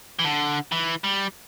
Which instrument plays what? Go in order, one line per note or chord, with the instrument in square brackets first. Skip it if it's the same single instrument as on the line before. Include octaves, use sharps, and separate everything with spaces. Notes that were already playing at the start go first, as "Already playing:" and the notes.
[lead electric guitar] E3
D3
E3
G3